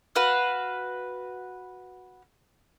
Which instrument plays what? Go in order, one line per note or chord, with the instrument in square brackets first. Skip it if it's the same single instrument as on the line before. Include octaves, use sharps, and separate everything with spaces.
[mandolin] F#4 B4 F5